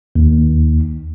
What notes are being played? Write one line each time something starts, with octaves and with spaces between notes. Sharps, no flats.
D#2